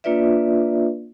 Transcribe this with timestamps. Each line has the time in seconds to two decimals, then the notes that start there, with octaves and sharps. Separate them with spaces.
0.04 A#3 D4 F4 B4 D5 E5